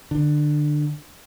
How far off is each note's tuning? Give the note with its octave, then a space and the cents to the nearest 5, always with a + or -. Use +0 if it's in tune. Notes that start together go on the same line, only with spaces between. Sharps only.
D3 +20